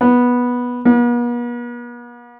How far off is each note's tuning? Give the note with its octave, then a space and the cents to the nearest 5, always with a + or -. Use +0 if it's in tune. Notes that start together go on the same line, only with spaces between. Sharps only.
B3 -10
B3 -45